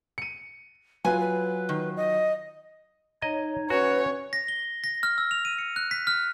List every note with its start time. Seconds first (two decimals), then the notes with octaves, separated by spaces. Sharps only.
0.18 C#7 D#7
1.05 F#3 F4 B4 G#5
1.20 B4
1.69 D#3
1.96 D#5
3.22 D#4 C#5 D#5
3.70 C#4 F#4 B4 C#5
4.33 A#6
4.48 G7
4.84 A#6
5.03 F6
5.18 E6
5.31 F7
5.45 D#7
5.59 C#7
5.76 F#6
5.91 B6
6.07 F6